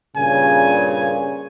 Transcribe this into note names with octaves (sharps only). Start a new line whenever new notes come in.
G2 A#2 C#3 G#5